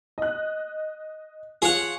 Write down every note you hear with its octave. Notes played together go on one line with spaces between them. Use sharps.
D#5 F#6
F4 G#4 C#5 F#5